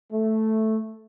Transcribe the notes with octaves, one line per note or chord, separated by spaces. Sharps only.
A3